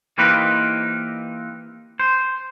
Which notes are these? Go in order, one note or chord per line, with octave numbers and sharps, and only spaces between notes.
E3 A#3 C4 D#4 G4 B4
C5